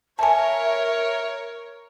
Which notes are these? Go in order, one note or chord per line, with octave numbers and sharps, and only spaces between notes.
A#4 C#5 E5 G#5 A5